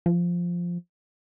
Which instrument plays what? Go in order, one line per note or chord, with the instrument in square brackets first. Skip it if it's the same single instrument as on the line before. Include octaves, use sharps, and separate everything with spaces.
[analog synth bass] F3